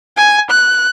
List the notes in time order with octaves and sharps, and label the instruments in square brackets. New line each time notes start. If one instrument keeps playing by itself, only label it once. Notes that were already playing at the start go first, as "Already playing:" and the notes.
[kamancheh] G#5
F#6